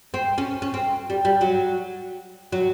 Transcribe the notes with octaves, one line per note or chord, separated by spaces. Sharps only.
C4
C#4
C#4
C4
G3
G3
F#3
F#3